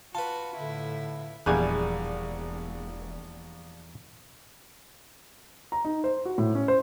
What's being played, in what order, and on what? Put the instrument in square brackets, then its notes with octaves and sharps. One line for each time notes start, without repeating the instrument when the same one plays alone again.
[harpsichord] F4 B4 [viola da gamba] F#4 [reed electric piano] A5
[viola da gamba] A2 E4 [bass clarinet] D3
[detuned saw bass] E1 [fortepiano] A#1 G#5 F#6 [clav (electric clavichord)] E2 G3 [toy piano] G#4 B5
[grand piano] A#5
D#4
C5
F#4
A2
C#4
C5